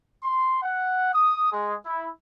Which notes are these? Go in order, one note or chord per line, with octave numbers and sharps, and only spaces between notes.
C6
F#5
D#6
G#3
E4